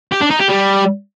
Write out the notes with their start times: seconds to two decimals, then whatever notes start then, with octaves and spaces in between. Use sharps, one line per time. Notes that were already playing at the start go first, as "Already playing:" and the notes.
0.12 G4
0.21 D4
0.31 D#4
0.40 G4
0.49 G3